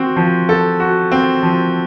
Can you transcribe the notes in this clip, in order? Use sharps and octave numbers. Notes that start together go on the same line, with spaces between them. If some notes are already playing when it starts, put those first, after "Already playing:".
Already playing: C4 F#4
F3
A4
F#4
C4
F3